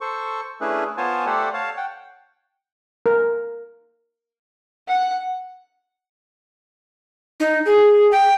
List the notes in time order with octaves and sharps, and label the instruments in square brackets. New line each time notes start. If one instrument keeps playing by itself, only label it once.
[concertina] A4 C5 C#6
A3 C#4 D4 E4 G#4 B4
B3 F4 C5 C#5 G#5 A5
A3 G4 A4 C5 D5 F#5
C#5 F5 A5
F#5 G5
[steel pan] A#4
[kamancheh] F#5
[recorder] D#4
G#4
G5